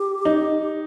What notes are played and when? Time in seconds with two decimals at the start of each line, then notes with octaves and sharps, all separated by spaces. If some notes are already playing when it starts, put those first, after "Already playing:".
Already playing: G4
0.25 D#4